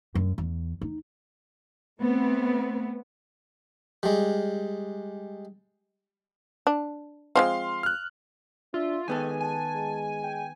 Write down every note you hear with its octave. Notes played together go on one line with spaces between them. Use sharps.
F#2
E2
D#4
A3 B3 C4
G3 G#3
D4
F3 G#3 C4 F5 C6
F6 F#6
D4 F4 E5
D#3 G#3 B3 A4 G5 G#5
G#5 A5
G#3
G5